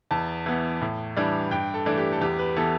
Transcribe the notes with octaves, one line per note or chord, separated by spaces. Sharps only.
E2 A5
E3 B3
A2
E3 G3 D4
G2 G5
A4
E3 A3 D4
G4
A4
E2 G4
B4
E3 B3 A4